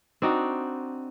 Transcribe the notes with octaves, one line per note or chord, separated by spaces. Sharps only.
C4 D4 D#4 F#4